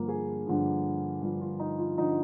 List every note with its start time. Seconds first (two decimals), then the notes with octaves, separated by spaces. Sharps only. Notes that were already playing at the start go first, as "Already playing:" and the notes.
Already playing: G2 D3 F3 A#3
0.08 G#4
0.46 G2 D3 F3
1.22 G2 D3 F3
1.41 F4
1.59 D#4
1.79 F4
1.97 D3 F3 D#4